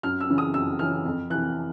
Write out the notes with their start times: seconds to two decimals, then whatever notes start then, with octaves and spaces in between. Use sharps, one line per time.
0.03 F#2 F6
0.20 E6
0.29 C#3 E3
0.38 D#6
0.54 F#2 E6
0.79 C#3 E3 F6
1.06 F2
1.30 C3 E3 F#6